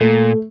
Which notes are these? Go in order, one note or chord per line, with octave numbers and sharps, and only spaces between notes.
A#2 A3